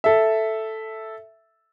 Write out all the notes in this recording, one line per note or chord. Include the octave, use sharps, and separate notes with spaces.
A4 E5